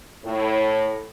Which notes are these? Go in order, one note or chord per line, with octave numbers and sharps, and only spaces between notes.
A2